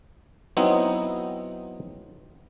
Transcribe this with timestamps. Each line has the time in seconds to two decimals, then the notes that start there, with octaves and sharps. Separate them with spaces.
0.57 F#3 B3 C4 D#4 E4